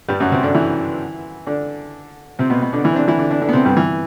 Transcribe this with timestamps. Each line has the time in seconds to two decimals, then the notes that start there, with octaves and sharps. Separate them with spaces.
0.09 G2 G3
0.20 F#2 F#3
0.32 C3 C4
0.43 D3 D4
0.54 E3 E4
1.47 D3 D4
2.39 C3 C4
2.50 B2 B3
2.62 B2 B3
2.73 D3 D4
2.84 E3 E4
2.92 C4
2.96 D3 D4
3.08 E3 E4
3.19 D3 D4
3.31 D3 D4
3.42 D3 D4
3.49 B3
3.53 C3 C4
3.65 G2 G3
3.77 E3